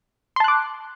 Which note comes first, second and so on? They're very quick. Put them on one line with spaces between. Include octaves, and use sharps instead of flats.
C6 A5 F#6 D6